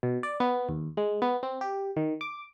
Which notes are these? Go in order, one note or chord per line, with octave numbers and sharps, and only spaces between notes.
B2
D5
B3
D#2
G#3
B3
C4
G4
D#3
D6